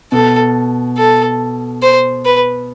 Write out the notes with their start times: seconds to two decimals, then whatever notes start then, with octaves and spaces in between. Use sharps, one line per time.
0.12 B2 A4
0.98 A4
1.82 C5
2.25 B4